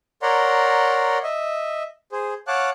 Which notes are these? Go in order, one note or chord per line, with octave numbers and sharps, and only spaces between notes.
A#4 C#5 D5 F#5 A#5 C6
D#5 E5
G#4 C5
C#5 F5 F#5 A5 D6 F#6